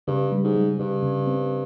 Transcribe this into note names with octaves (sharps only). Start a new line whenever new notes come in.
G2 C#3
G3
G#2
G3
G2 C#3
C#3
C4